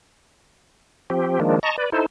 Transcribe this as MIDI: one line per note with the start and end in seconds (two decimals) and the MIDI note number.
1.10 1.40 53
1.10 1.40 60
1.10 1.40 67
1.40 1.59 51
1.40 1.59 53
1.40 1.59 56
1.40 1.59 58
1.40 1.59 62
1.63 1.76 75
1.63 1.76 81
1.63 1.76 82
1.63 1.76 85
1.78 1.90 71
1.78 1.90 74
1.92 2.06 63
1.92 2.06 64
1.92 2.06 69
1.92 2.06 72